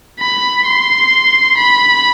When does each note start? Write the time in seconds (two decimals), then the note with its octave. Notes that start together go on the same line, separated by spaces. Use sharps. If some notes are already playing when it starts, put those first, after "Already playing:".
0.20 B5
0.66 C6
1.57 B5